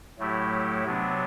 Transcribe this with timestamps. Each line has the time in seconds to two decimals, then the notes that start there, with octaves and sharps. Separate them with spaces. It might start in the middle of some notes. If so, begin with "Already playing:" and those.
0.19 A2 F#3 A3 E4 G4
0.85 C3 F#3 B3 D4